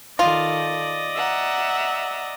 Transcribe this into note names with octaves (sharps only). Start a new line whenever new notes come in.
D#3 F4 A4 D5 D#5
E5 F#5 A#5